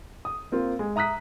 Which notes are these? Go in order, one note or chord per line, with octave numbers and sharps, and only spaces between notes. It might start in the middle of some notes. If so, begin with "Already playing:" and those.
D#6
A#3 C4 F4
G#3
E5 A#5 D#6 F#6 B6